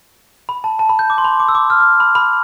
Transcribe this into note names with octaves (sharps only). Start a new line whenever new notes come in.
B5
A5
A5
B5
G6
D6
C6
B5
D6
E6
D6
F6
F6
B5
B5